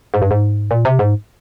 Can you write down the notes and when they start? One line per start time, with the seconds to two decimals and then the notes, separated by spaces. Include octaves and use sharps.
0.14 G#2
0.22 G2
0.31 G#2
0.71 A#2
0.85 C3
0.99 G#2